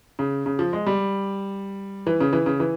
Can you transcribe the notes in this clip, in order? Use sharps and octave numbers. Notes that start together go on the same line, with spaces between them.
C#3
C#3
F3
G#3
G3
E3
C#3
E3
C#3
E3